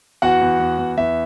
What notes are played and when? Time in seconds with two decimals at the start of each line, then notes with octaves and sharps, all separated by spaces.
0.22 E2 F#4 F#5
0.41 E2
0.60 E2
0.79 E2
0.97 E2 E5